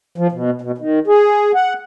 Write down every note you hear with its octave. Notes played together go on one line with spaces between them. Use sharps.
F3
B2
B2
D#3
G#4
F#5